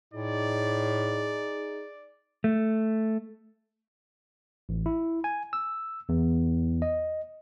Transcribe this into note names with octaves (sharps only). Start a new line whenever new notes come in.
A2 D#4 G#4 D5
A3
A1
E4
G#5
E6
E2
D#5